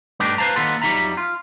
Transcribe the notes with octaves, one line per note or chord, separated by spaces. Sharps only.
G2 A3 D4 D#4 G4
B4 C5 D5 F5 A5 A#5
D#3 A#3 B3 A4 C6
F2 F#3 G3 D#4 E5 A#5
F4